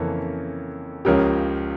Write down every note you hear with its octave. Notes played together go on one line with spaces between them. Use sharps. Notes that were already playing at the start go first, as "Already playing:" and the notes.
Already playing: F2 C#3 E3 A#3 C#4 A4
C#2 C#3 F3 C#4 G4 A#4